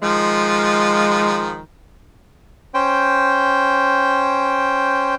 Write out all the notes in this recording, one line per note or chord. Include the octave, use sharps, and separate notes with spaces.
D#3 F3 G#3 F4
C#4 C5 G5